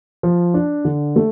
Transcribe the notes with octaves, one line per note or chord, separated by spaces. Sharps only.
F3
D4
D3
A3